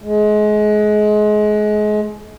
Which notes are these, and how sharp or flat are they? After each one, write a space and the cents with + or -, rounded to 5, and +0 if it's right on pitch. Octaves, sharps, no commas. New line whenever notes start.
G#3 +25